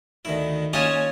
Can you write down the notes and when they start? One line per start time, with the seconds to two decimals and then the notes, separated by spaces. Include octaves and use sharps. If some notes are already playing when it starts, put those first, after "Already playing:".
0.25 D2 D#3 E4
0.73 A#3 C#4 F4 C#5 D#5 G#5 A5